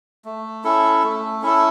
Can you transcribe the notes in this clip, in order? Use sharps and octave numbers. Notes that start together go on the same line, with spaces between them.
A3
C#4 E4 A4
A3
C#4 E4 A4